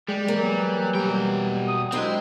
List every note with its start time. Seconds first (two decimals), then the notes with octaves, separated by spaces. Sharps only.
0.08 G3 G#3
0.28 E3 F#3 A#3
0.95 B2 G3 G5
1.67 D#6
1.92 F#3 G#3 C4 D4 E4